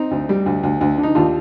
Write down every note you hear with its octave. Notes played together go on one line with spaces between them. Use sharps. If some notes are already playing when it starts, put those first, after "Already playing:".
Already playing: C4 D#4
D2
G3
D2
D2
D2
D3
D#4
D#2 D4 F4